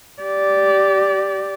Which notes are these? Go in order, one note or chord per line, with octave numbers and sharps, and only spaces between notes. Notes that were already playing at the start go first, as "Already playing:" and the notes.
G4 D5